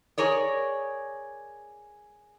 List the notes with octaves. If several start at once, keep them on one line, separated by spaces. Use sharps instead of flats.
G#4 A#4 C#5 D5